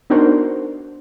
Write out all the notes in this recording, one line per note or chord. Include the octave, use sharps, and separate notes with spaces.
B3 D4 D#4 F#4 A#4 C5